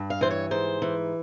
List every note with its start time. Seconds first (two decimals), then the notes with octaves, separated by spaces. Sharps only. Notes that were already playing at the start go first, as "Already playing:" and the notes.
Already playing: G2
0.10 F5
0.21 E3 C5
0.31 C#5
0.51 G#2 C5
0.82 E3